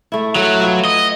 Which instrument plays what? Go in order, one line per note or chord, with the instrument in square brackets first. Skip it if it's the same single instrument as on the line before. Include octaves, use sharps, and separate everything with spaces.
[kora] A3 E4
[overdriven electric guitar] F#3 [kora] A3 B4 E5
[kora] B3 F4 E5
[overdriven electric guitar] D#5